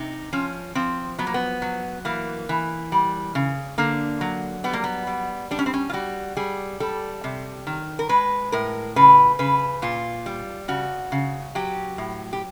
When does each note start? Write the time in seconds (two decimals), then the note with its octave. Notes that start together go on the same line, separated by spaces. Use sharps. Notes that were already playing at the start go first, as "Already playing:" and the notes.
Already playing: C3 D#4
0.33 F3 C#4
0.75 F3 C4
1.18 F#3 B3
1.27 A#3
1.34 B3
1.62 F#3
2.05 E3 A#3
2.49 E3
2.92 G3
3.35 C#3
3.78 D3 A#3
4.21 F#3
4.64 G3 B3
4.73 A#3
4.84 B3
5.07 G3
5.51 G3 D4
5.59 C#4
5.66 C4
5.74 C#4
5.89 F4
5.93 G3 F#4
6.37 G3 G#4
6.80 G3 A4
7.24 C3
7.67 D#3
7.99 A#4
8.09 G#3 B4
8.52 A2 A#4
8.96 C#3 B4
9.39 C#3 B4
9.82 A#2 F4
10.26 G3
10.68 C#3 F#4
11.12 C#3
11.55 F#3 G4
11.98 A2
12.33 G4